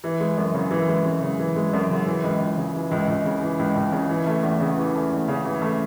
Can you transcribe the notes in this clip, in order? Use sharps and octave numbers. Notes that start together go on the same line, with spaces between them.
E3
G#3
F#2
C#3
E3
G#3
F#2
C#3
E3
G#3
F#2
C#3
E3
C#2
C#2
C#3
E3
C#2
C#2
C#3
E3
C#2
C#2
C#3
E3
A3
E2
C#3
E3
A3
E2
C#3
E3
A3